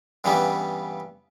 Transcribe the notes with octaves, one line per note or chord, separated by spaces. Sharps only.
G2 C#3 E3 G3 B3